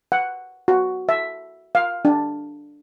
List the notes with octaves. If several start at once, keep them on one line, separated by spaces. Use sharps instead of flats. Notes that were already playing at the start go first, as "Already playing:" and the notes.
F#5
F#4
E5
F5
D4